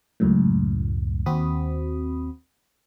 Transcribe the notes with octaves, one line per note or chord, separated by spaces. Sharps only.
C#2 F#2 A2
D#2 C4 F#4 B5 D#6